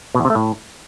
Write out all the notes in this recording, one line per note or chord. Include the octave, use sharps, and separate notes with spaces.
B2
E2
C3
A3
A2